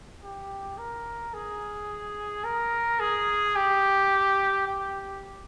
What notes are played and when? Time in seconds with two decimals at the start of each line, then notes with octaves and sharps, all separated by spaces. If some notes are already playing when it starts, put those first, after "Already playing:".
0.23 G4
0.78 A#4
1.34 G#4
2.44 A#4
3.00 G#4
3.56 G4
4.67 G4